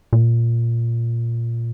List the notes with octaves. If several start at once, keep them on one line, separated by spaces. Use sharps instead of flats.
A#2